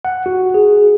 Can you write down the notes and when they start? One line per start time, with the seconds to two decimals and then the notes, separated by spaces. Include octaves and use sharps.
0.05 F#5
0.26 F#4
0.54 G#4